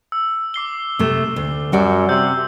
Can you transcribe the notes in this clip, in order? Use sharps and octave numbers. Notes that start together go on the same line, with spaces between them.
E6
D6 C7 G7
C3 A3
D2
F#2 G3 F#4 D5
C3 E6 G6